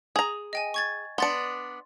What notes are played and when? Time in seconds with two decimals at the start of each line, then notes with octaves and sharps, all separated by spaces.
0.16 G#4 A#5
0.53 D#5 G5 G#5
0.74 C#6 G#6 A6
1.18 B3 D4 C6 A6 C#7